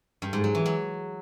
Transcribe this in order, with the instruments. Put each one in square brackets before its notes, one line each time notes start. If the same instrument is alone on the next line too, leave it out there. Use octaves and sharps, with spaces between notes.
[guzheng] G2
G#2
F#3
E3
F#3